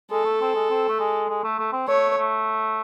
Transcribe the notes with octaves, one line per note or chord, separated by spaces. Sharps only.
G#3 A4
A3
C4
G#3
C4
A3
G#3
G#3
A3
A3
C4
A3 C#5
A3